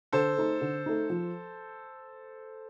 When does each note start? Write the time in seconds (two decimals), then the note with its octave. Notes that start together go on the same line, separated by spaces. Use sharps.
0.12 D3 A4 C5
0.37 A3 D#4
0.61 D3
0.86 A3 D#4
1.10 F3